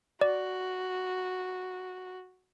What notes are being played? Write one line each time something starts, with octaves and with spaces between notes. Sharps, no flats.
F#4 D5